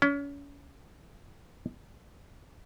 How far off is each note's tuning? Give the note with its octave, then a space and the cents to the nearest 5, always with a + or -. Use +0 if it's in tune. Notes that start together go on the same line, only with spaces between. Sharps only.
C#4 +35